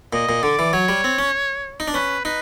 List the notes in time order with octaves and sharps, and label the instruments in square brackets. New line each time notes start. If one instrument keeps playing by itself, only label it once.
[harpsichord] A#2 [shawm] D#5
[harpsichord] A#2
[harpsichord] D3 [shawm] D5
[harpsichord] E3
[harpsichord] F#3 [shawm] C#5
[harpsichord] G3
C4
C#4
D#4
D4
[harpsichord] C#4 [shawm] B4
[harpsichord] D#4 [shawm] B4